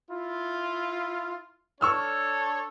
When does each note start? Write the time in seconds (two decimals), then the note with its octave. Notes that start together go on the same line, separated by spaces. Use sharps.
0.11 E4 F4
1.81 D4 A4 C#5 C#6 E6 F6